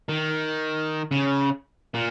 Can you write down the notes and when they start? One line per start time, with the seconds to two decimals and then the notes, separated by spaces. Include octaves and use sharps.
0.09 D#3
1.11 C#3
1.94 A#2